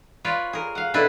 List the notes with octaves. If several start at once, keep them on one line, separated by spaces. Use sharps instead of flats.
F4 B4 C#5 D5
G#4 A#4
F5 F#5
B2 D4 E4 A4 B4